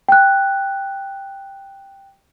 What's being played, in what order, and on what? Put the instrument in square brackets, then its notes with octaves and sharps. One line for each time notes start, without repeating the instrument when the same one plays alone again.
[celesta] G5 F#6